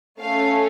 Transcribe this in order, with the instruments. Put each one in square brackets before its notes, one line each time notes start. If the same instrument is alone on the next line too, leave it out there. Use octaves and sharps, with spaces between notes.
[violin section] A3 C#4 A4 F5